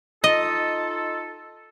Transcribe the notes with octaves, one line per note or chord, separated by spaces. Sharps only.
D#4 F4 A4 D#5